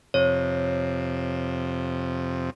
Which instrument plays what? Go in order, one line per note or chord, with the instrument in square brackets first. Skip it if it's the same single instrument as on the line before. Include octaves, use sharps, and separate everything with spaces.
[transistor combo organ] F2 C3 [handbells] C#5